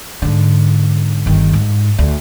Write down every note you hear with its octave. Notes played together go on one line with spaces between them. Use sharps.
G#2 D3
G1 D#3
G#2
D2